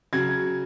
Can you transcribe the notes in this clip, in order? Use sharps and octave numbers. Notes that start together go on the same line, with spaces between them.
C#3 F#3 G#6